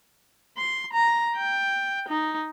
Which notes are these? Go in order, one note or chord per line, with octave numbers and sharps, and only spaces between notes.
C6
A#5
G5
D#4